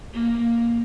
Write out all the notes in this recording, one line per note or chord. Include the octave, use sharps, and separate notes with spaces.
A#3